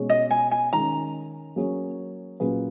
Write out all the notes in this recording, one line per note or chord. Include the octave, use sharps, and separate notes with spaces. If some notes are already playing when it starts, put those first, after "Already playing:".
Already playing: B2 G#3 C#4 G#4 C#5
D#5
G#5
G#5
D#3 G#3 C#4 A#5
F#3 A#3 C#4 G#4 C#5
A#2 F#3 C#4 G#4 B4